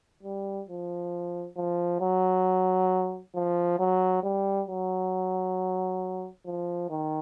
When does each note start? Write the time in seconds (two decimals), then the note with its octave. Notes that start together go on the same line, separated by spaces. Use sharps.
0.23 G3
0.68 F3
1.57 F3
2.00 F#3
3.35 F3
3.79 F#3
4.23 G3
4.68 F#3
6.46 F3
6.90 D#3